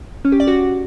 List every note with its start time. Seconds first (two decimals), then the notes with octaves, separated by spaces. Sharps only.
0.25 C#4
0.32 G4
0.40 D5
0.47 F#4